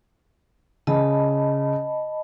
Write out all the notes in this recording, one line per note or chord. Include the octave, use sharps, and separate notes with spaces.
C#3 D#5 A5 B5